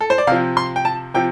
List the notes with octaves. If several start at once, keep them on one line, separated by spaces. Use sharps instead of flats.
A4
C5
D5
C3 F3 F5
C6
G5
A5
C3 F3 G5